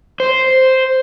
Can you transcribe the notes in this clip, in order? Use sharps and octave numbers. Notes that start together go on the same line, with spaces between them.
C5